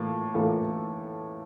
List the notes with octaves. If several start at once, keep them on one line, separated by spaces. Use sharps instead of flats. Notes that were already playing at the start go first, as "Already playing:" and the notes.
Already playing: A2 E3 A#3 F4
A2 E3 A#3 F4 A4